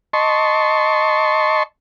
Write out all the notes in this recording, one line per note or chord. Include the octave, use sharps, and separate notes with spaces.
D#5 A5 C6 C#6